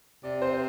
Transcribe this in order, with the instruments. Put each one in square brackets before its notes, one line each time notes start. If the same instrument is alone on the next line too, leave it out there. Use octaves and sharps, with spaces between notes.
[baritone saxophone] C3 [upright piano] D5
[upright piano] C5